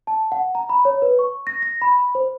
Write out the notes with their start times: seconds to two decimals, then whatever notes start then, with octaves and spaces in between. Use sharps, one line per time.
0.07 A5
0.32 F#5
0.55 A#5
0.69 B5
0.85 C#5
1.02 B4
1.19 C#6
1.47 A#6
1.62 A#6
1.82 B5
2.15 C5